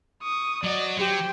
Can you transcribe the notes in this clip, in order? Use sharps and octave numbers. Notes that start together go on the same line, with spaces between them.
C#6 D#6
F#3 F#4 D5 D#5
F#3 G4 C5 G5